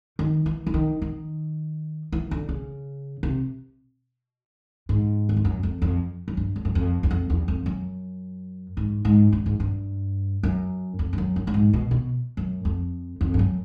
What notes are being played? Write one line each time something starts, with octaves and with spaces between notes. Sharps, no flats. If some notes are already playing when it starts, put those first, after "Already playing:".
D#3
E3
E3
D#3
D#3
E3
D3
C#3
C3
G#2
E2
F2
F#2
F2
F2
F#2
G2
F2
F#2
F2
E2
F2
E2
F2
F#2
G#2
G#2
G2
G#2
G2
F#2
F2
G2
F#2
G2
G2
G#2
B2
B2
F#2
F2
F2
G2
F#2